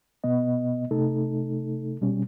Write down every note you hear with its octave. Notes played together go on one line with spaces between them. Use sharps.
B2 B3 D#5
C3 A3 D#4 A4
B2 G3 C#4